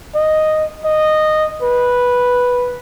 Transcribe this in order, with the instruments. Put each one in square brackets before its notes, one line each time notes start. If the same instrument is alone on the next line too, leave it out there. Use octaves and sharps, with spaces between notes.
[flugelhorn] D#5
D#5
B4